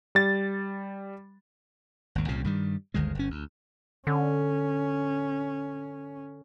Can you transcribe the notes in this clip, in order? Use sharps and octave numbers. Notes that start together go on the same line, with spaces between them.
G3 A6
G#1 D#2
C2 A#2 C#3
G2 D#3 G3
G1 D2 D#3 G#3
G1 C#4
D2
D3 C#4